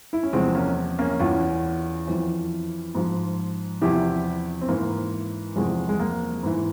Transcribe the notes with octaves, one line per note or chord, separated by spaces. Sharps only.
E4
C#4
E2 C3 F3 G#3 C4
A#3 C#4
A#3 C#4
E2 E3 C#4 F4
F2 E3
G#2 F3
E2 C3 F3 E4 G4
C4
G#2 E3 A#3
E2 C3 F3 G#3
G#3
A#3
G#2 E3